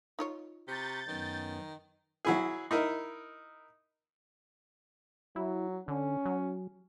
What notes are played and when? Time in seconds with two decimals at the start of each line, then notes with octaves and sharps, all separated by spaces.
0.19 D#4 F4 C#5
0.68 C3 A#5 B5 C#6 G6 A6
1.08 F#2 D#3 B3 C#4
2.25 F#3 E4 G#4
2.71 D#4 E4 A#4
5.36 F#3 E4
5.88 D3 C#4
6.26 F#3